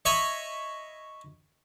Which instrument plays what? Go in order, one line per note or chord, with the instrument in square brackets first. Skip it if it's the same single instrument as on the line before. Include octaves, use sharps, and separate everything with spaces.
[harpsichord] C#5 D#5 E5 B5